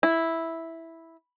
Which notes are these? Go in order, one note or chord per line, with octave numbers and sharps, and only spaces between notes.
E4